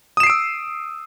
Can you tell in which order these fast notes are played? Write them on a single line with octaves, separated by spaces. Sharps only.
D#6 E7 C7 D7 E6